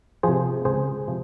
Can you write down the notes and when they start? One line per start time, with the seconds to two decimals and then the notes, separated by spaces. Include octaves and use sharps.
0.23 C3 F3 G#4 C5
0.65 C#2 G#4 C5
1.07 C3 F3